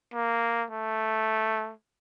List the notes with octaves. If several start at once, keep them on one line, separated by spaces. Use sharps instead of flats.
A#3
A3